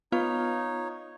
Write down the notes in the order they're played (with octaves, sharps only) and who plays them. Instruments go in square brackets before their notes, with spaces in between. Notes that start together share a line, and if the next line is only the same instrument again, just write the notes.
[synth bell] B3 F4 F5 [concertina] D#4 C#5